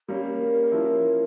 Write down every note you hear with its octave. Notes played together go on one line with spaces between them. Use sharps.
G3 A#3 C#4 A#4
F3 C#4 E4